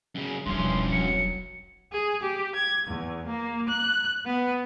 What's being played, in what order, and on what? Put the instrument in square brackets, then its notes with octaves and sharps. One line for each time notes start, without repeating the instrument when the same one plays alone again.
[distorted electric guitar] F#2 C#3
[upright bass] E1 B1 [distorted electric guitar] G2 C#4 [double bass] E3 F3 [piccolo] C6
[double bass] F#3 [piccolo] C#7
[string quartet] G#4
G4
G#6
E2
A#3
F#6
B3